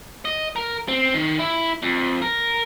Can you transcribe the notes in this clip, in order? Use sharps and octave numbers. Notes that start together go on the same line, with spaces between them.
D#5
A#4
C4
D#3
E4
F2
A#4